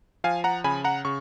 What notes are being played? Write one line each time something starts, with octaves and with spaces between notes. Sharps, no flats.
F3 F5 G#5
F#5 A#5
C#3 G#5 B5
F#5 A#5
C#3 C#6